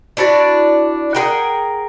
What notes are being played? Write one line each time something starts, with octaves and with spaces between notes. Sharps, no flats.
D4 E4 F#4 D5
G#4 A#4 F#5 G5